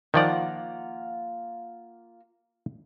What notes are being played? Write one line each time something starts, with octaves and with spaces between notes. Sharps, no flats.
D#3 F3 A#3 F4 D5 F#5